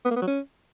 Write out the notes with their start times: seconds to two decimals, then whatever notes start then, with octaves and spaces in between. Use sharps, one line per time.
0.05 B3
0.11 A#3
0.16 B3
0.22 F#3
0.27 C#4